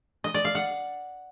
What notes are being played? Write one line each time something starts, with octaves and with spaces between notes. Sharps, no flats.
D#5
D5
F5
F#5